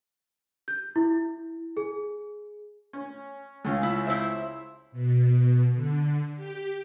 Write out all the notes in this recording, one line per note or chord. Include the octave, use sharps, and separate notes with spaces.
G6
E4
G#4
C#4
C#2 C#4 F4
E4
E4 C5 E5
B2
D3
G4